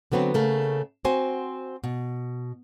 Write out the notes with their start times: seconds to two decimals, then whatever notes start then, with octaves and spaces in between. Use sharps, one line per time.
0.12 D3 F#3 B3 C4 F#4
0.34 C#3 A3 A#3
1.05 C4 F#4 C5 G#5
1.84 B2